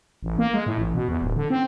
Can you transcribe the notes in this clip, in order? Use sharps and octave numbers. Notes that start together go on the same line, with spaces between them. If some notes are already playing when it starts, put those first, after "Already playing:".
A1
A#3
G#3
A2
A1
B2
E2
D1
D3
C4